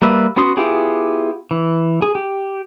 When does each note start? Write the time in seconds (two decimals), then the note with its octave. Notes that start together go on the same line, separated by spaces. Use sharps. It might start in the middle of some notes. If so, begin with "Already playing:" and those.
0.02 G3 A#3 B4 E5
0.36 B3 C#4 F#4 C6 D#6
0.57 B3 E4 F4 G4 G#4
1.51 E3
2.02 G#4
2.15 G4